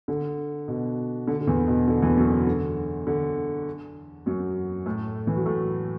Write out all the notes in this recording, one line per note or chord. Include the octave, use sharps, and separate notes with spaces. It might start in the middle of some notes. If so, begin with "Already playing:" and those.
D3
B2
D3
D3
E2 E3
B2
D3
E2 E3
F#2 F#3
D3
D3
D3
F#2 F#3
A2 A3
E3
F#3
A2 A3